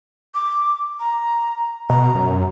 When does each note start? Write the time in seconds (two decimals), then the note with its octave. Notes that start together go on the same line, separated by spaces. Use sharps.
0.35 D6
1.00 A#5
1.90 B2 A#5
2.15 F#2